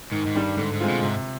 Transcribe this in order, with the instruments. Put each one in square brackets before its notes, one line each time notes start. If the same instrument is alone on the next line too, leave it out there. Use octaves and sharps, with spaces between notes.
[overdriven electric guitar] G#2 [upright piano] D#3
[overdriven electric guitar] G#2
[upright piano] G3 D4
[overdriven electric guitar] G2
[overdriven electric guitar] G#2 [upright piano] D3
[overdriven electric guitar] G#2
[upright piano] G#3 C4 F4
[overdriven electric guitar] B2
[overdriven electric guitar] G#2 [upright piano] C3